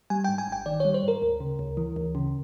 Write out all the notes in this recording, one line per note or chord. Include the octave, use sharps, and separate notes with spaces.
G3 G#5
G#2 G5
G#5
G#1 G5
D#3 D5
G3 C#5
C5
G#2 A#4
D2
C#3
D2
E3
D2
C#3